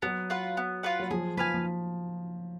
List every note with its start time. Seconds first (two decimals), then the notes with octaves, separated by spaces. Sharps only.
0.02 F#3 B3
0.30 F4 B4 F#5
0.57 B3
0.83 F4 B4 F#5
0.99 F#3
1.11 F3 G#4
1.37 F3 B4 F5 G#5
1.54 F3